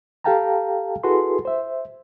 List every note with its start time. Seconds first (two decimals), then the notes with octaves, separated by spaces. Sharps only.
0.24 G4 A4 F5 G5 A5 A#5
1.04 E4 F#4 G#4 A4 B4 C6
1.45 C5 E5